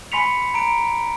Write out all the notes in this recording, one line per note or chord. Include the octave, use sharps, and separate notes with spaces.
G#5 B5 C6 B6 C#7 F7
A#5 D7